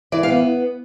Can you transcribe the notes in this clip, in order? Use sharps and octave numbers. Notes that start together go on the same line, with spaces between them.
E3 D5
F5
B3